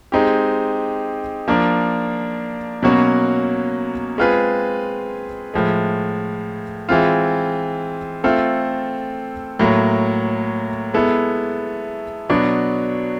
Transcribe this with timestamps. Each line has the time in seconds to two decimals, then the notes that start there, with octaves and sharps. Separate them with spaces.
0.12 G#3 C4 D#4 G4
1.48 F3 A#3 D4
2.83 B2 F#3 A#3 C#4 F#4
4.18 G#3 C4 F4 G#4 B4
5.54 A2 F3 G#3
6.89 E3 G#3 C4 F4
8.24 A3 C4 F4 A4
9.59 A2 F#3 A#3
10.94 G#3 B3 E4 A4
12.29 B2 F#3 B3 D4 F#4